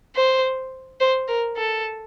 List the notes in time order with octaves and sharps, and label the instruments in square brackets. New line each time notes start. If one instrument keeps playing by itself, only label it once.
[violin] C5
C5
A#4
A4